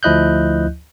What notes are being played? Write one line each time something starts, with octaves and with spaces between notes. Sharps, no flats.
D2 F3 E4 D#5 F#6 G6